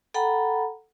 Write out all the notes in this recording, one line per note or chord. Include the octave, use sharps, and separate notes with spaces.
A4 F#5 G5 A#5 B5